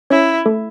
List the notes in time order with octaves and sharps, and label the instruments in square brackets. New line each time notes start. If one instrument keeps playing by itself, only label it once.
[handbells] C#4 C#5 [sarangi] E4
[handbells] A3 A4